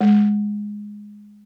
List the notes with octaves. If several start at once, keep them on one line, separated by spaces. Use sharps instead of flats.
G#3